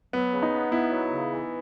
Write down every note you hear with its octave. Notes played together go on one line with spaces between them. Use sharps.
F#3 B3
C#3
D#4
B3
B3 E4
F#3
C#3
E3